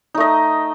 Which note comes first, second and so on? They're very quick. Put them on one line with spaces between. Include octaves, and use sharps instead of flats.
D#4 A3 D#5